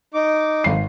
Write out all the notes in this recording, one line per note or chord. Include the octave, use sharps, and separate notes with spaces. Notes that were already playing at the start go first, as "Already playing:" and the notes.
D#4 D6
G#1 C7